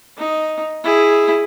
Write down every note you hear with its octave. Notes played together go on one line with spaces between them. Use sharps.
D#4
E4 G#4